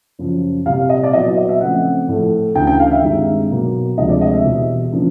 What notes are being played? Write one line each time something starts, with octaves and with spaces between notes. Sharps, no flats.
F#2 C#3 F3
C2 A#2 G3 F5
D#5
D5
A#2 F#3 B3 E4 D#5
D#5
E5
C#3 F3 A3 C4 F#5
A2 F3 A3
D2 C#3 E3 G5
G5
F5
E5
G2 D#3 G#3 C4 D#4 E5
B2 F#3 A#3
D2 C3 F3 G#3 D#5
D5
D#5
E5
E2 B2 G3
C#3 F3 A#3 D4